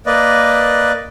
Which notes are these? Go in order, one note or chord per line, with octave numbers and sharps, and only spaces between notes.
A#3 B4 D5 D#5